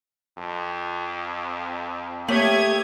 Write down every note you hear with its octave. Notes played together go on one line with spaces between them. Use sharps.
F2
A3 A#3 G4 C#5 D#6 G#6 B6